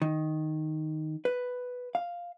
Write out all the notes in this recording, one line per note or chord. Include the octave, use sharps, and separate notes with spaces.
D#3
B4
F5